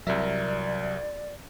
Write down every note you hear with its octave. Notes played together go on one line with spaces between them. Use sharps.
C2 C3 F#3 A#4 D5 E5